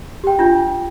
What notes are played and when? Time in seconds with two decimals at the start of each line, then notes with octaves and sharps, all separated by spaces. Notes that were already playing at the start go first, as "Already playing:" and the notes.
0.24 G4 G5
0.39 D4 F4